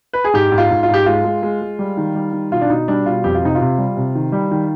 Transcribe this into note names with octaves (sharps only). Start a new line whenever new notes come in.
B4
G#4
G#2 G4
G#2
F4
G#2
F4
G#2 G4
G#3 F4
G#3
G#3
G#3
G3
D#3
G3
D#3
B2 F4
D4
B2 D#4
G3 D4
B2 F4
F2 G4
F4
C3 D#4
F4
C3
G3
C3
D#3
G3
D#3